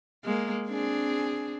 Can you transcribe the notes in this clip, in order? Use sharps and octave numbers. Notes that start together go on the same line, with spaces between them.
G#3 A#3
C4 D4 G#4